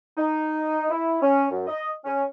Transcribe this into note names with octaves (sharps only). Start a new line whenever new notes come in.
D#4
E4
C#4
F#2
D#5
C#4